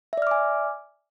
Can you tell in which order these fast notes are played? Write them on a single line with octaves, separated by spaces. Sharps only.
E5 D5 F6 D6 G#5